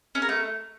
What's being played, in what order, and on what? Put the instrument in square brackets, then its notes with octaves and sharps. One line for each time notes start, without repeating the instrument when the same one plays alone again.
[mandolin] C#4
A#4
A3